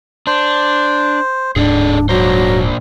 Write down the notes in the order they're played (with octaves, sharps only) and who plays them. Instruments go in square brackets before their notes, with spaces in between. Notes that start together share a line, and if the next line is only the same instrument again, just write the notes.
[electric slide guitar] D4 [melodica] C5
[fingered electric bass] D1 G#2 [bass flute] D4 [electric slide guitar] G#4 A4 D5
[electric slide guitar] A#2 D4 C5 [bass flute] F#3 [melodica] A#5